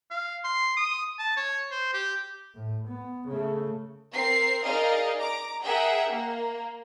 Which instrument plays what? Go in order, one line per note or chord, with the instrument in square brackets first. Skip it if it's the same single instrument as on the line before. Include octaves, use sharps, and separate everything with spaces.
[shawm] F5
C6
D#6
A5
C#5
C5
G4
[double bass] A2
B3
C#3 A3
[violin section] C4 A#4 C7
D#4 G#4 A#4 D5 D#5 F5
A#5 D6
G#4 A#4 E5 F#5 G5
A#3